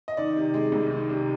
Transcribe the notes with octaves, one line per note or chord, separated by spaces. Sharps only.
D#5
D#3 D5
C3
G#3
C2
D#3
C3